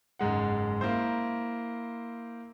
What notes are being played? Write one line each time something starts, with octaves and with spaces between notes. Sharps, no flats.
F#1 G#2 G#3 F#5
A#3 E4 C5